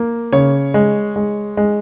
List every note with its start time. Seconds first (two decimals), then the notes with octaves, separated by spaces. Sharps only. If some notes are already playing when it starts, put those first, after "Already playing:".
Already playing: A#3
0.32 C#3 C#5
0.74 G#3
1.16 G#3
1.57 G#3